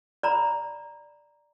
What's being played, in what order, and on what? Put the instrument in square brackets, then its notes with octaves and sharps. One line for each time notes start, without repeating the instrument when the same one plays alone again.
[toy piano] D5 A#5 B5